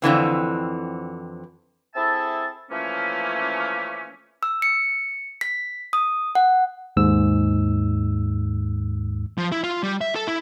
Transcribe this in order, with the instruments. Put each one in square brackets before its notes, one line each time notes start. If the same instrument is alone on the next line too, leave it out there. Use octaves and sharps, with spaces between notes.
[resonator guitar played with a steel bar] F2 D3 E3 C4
[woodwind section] C4 E4 G#4 A4 E5 A5
E3 F3 A3 A#3 C#4
[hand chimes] E6
C#7
B6
D#6
F#5
[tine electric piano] D#2 G#2 E6
[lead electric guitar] F3
E4
F4
G3
E5
A4
E4